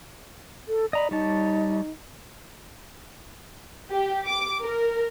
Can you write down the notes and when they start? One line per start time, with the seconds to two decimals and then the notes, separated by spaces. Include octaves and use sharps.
0.68 A4
0.93 D5 D#5 A#5 B5
1.11 G3 D#4 C#5 A5
3.90 G4
4.26 D6
4.62 A#4